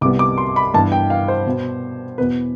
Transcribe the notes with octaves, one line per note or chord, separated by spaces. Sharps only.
C2 C3 G3 B3 D6
D6
C6
B5
G2 E3 B3 A5
G5
F5
C5
B2 B3
E2 B2 B3 B4